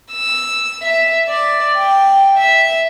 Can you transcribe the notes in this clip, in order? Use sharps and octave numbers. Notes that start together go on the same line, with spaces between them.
E6
E5
D5
G5
E5